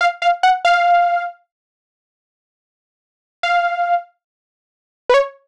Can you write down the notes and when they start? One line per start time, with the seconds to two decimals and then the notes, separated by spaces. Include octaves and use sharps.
0.01 F5
0.22 F5
0.43 F#5
0.65 F5
3.43 F5
5.09 B4
5.14 C#5